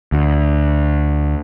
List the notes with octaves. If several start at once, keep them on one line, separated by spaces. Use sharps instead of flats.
D2